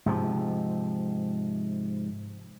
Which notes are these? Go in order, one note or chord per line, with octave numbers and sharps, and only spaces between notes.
G#2 C3 F3